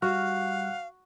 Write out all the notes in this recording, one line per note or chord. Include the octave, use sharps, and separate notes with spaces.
G3 F#4 F5 F#5 F6